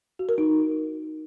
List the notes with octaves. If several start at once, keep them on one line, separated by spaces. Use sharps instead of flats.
F#4
A#4
D#4